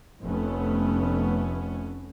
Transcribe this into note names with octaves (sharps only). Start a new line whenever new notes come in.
F1 F2 A3 B3 C#4